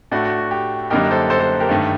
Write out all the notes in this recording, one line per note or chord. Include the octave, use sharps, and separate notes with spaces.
A2 A3 D4 F#4
F#4
F#4
G4
F#2 D3 G3 A#3 D#4 G4 A#4
A4 C5
A4 C5
A4 C5
G4 A#4
G2 D#3 A3